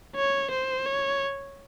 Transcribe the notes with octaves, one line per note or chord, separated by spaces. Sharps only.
C#5
C5
C#5